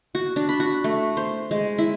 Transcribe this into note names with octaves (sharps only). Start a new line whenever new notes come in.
F#4
D4
B5
F#4
A3
C5
G#3
E4